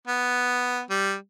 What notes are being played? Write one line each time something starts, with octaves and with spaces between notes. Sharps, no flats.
B3
G3